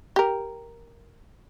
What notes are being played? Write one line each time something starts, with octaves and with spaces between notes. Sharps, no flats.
G4 A#4